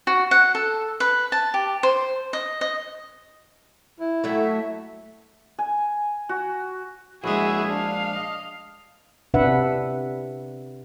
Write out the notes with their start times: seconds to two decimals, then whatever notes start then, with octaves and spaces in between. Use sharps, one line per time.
0.07 F#4
0.31 F#5
0.55 A4
1.00 B4
1.32 A5
1.54 G4
1.83 C5
2.33 D#5
2.61 D#5
4.00 E4
4.24 F#3 A3 F#4 E5
5.59 G#5
6.29 F#4
7.24 A#1 G#3 E4 F#4 G#4 E5
7.69 D4 F5
8.15 D#5
9.34 C3 D4 B4 E5 F#5